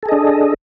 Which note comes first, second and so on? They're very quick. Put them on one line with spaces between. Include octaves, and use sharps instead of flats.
A4 G#4 D#5 D4